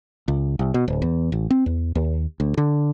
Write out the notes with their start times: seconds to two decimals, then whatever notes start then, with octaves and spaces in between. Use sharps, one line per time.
0.28 C#2
0.59 C2
0.74 B2
0.88 D1
1.02 E2
1.32 A1
1.50 C4
1.66 E2
1.95 D#2
2.40 D2
2.58 D3